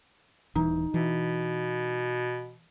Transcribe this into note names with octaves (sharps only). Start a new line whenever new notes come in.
D#1 E3 D#4
B2 E3